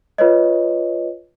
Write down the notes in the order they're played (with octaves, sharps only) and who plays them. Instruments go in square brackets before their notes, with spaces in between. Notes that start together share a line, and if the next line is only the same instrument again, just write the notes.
[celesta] F4 B4 C#5 D#5